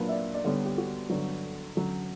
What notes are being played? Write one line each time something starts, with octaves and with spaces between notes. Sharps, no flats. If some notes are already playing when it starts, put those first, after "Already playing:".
Already playing: A#2 F#3 A#3 D4 B4
E5
D5
D5
D3 G3 B3 C#5
G4
F#4
G2 D3 F#3
D3 F#3 C#4